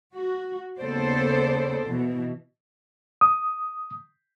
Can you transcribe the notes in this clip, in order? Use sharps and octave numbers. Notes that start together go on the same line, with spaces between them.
F#4
D#2 C#3 B3 A4 C5 D5
B2 E3
D#6